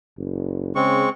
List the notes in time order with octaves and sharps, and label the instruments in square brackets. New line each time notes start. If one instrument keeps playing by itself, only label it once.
[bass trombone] F#1
[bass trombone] C#3 [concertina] G#3 C4 C#6